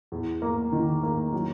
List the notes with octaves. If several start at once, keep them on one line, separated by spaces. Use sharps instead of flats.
E2
A#3
D#3
A#3
F#3